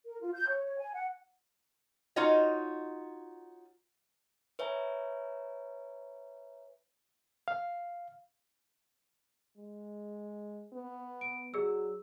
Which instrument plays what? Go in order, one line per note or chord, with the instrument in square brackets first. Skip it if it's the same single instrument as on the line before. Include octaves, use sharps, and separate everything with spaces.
[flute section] A#4
F4
G6
C#5
C#5
G#5
F#5
[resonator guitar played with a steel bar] D#4 F4 F#4 C#5 D#5
[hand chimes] B4 C#5 E5 G#5 A#5
[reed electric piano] F5
[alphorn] G#3
B3
[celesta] D7
[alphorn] F#3 [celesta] G#4 D5 E6